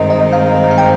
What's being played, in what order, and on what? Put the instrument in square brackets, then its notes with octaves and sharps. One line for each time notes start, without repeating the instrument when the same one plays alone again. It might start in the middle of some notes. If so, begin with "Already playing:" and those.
Already playing: [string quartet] G2 D#3 G#3 C4 D#4 [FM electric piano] A#4 C5 D#5
[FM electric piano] D#5
F5
F5
G5